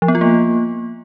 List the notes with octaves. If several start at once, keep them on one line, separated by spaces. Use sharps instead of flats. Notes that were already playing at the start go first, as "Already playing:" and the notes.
F3
B3
F4
A#3